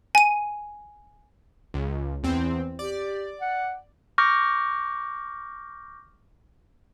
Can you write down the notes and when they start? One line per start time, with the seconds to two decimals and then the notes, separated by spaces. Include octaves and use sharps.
0.15 G#5 D#7
1.74 C#2
2.23 E2 C4
2.79 G4 D5
3.41 F#5
4.18 C#6 D6 F6 G6 A#6